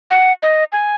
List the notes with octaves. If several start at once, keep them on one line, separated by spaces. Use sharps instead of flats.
F#5
D#5
G#5